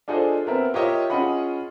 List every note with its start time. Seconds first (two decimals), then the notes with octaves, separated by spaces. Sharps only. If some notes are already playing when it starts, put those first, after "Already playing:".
0.08 D4 F4 G#4 A4 C5 D#5
0.46 B3 C4 A#4 E5
0.74 F4 G4 A#4 C#5 D#5 E5
1.10 C#4 F4 G#4 D#5 F#5 B5